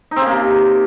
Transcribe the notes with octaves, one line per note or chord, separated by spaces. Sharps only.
D#4
C4
C#3
A#3
C3